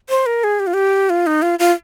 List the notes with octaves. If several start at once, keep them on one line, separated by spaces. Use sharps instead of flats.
C5
A#4
G#4
G4
F4
G4
F4
D#4
F4
F4